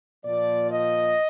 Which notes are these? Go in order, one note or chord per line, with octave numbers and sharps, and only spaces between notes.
A#2 F3 D5
D#5